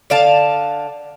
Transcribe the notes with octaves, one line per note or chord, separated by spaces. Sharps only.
D3 D5 F5 A5